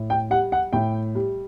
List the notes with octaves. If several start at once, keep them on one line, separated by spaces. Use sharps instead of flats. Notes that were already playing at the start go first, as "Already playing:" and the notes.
Already playing: A2
G5
G3 F#5
F#5
A2 G5
G3